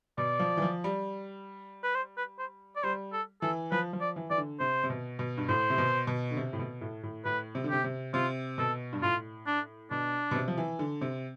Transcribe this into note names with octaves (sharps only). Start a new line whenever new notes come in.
B2 D5
F3
E3
F3
G3
B4
C5
B4
C5
D5
G3 C5
A4
E3 A4
F3 B4
F3
D5
E3
E3 D5
D3
C3 C5
C3
B2
B2
G2
A2 C5
C3
B2
B2
D3
C3
A2
B2
A2
A2
A2 B4
C3
D3
C3 G4
C3
C3 F4
B2 A4
G2
A2 F4
D4
B2 D4
B2
C3
F3
E3
D3
C3